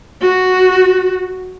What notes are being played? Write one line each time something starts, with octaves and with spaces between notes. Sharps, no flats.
F#4